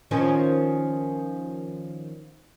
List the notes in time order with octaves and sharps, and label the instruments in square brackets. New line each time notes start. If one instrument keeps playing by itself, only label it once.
[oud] D#3 F3 C#4